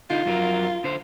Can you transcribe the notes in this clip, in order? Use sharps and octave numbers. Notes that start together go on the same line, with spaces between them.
D3 D#4 F4
F2 F#3 A#4
D3 C5